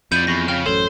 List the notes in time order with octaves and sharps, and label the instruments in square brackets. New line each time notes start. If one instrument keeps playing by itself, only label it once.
[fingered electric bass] F2 [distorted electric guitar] E4 D5 [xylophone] G6 C#7 D#7
[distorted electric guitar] E2 [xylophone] B5 C#6 A#6
[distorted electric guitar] C#3 [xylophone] G5 F6
[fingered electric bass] A1 F#2 [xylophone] A4 C#5 F7 [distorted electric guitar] C5